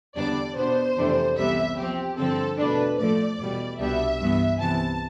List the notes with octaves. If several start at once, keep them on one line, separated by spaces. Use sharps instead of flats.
E2 D3 G3 B3 D4 D5
B2 B3 D4 C5
F2 C3 E3 A3 D4
C2 C3 E3 G3 B3 E5
C3 F3 C4 G4
G2 D3 F3 C4 A4
E2 B2 A3 D4 B4
A2 F3 A3 D5
E2 B2 G3
C2 B2 G3 B3 D4 E5
G2 E3 B3
C2 C3 E3 B3 A5